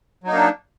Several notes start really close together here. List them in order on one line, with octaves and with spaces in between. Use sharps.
F#3 D#4 A#3 D4